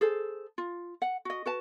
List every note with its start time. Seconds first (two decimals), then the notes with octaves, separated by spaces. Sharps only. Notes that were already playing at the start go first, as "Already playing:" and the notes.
0.01 G#4 A4 C5
0.58 F4
1.02 F#5
1.25 F#4 D#5
1.46 F#4 B4 A5